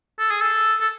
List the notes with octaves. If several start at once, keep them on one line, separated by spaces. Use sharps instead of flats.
A4
G#4
A4
A4